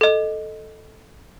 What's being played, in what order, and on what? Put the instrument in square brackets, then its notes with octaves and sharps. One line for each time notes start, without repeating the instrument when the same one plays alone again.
[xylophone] A4 D#5